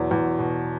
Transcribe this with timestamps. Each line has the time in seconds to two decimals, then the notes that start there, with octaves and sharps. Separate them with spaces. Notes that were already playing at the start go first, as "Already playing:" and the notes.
Already playing: E2 B2 F#3
0.11 E2
0.39 B2